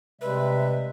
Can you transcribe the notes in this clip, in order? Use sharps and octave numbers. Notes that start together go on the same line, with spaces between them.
C3 G3 G#3 B4 E5